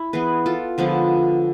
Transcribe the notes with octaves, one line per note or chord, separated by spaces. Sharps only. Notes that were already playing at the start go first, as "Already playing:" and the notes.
Already playing: E4
E3 B3 G#4 B4
F4 A4
D3 F3 G#3 B3